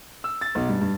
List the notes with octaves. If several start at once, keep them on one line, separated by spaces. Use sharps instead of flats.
E6
A6
B1
G2
G2